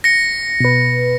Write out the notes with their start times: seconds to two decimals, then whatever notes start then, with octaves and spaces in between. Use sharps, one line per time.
0.04 A#6 C#7
0.60 B2 B4